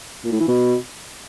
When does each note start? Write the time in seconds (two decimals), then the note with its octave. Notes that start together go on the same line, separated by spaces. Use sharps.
0.24 A#2
0.32 A2
0.40 E3
0.48 B2